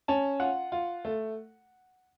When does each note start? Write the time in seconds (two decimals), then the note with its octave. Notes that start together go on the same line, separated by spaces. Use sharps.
0.08 C#4 A5
0.40 F4 F#5
0.72 F4
1.05 A3